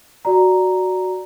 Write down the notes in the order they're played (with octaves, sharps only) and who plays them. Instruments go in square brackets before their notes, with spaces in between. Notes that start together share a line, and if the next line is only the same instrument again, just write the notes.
[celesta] F#4 D5 A#5